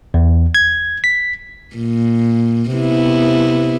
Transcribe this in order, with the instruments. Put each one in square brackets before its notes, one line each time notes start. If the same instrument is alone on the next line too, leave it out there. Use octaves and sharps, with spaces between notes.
[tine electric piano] E2
G#6
B6
[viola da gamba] A#2
C3 B3 E4